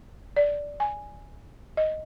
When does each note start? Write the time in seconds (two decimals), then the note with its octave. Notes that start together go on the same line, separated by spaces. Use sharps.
0.36 D5
0.80 G#5
1.77 D#5